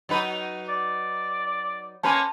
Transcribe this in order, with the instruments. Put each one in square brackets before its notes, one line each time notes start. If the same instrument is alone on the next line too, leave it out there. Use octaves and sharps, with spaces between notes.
[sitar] F#3 D#4 B4
[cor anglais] D5
[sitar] A#3 C#4 B4 [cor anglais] C5 [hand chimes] A5